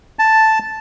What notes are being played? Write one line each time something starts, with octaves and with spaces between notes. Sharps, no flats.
A5